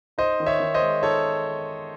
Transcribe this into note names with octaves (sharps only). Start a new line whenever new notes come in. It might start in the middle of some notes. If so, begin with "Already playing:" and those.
D#4 C5 D#5
D#3
C#5 E5
D#3
C5 D#5
G#3
D#4 A4 C#5